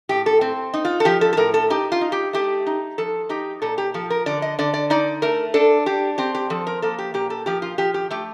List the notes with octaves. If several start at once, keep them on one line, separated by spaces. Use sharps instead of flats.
A2 G4
A4
C4
D#4
F4
A4
F3 G4
A4
A4
A2 A#4
A4
D#4 G4
F4
D#4
G4
A3 G4
D#4
F3 A4
D#4 G4
A#2 A4
G4
F3 A4
A#4
D3 D5
D#5
D3 D5
D5
D#4 D5
A3 A#4
D4 A4
D4 G4
C4 G4
G4
F3 A4
A#4
A#3 A4
G4
A#2 G4
A4
F3 G4
F4
F3 G4
G4
A3 G4